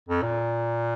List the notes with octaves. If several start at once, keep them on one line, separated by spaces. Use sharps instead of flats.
F2
A#2